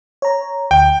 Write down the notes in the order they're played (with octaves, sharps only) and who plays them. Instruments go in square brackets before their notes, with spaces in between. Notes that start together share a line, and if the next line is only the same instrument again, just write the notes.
[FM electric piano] C#5 A#5
[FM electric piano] D2 [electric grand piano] G5